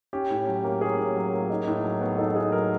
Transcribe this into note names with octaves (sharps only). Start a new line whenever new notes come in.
C#4 G4
A2
F#3
A#3
C#4 G#4
A2
F#3
A#3
D#4
A2
F#3
B3
D#4 A4
A2 G#4
F#3 A#4